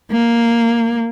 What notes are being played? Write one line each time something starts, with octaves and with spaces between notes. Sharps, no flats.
A#3